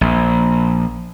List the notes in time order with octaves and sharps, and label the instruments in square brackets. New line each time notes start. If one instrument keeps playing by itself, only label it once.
[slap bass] A#1